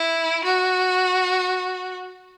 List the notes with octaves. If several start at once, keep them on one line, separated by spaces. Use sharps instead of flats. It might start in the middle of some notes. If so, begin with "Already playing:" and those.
Already playing: E4
F#4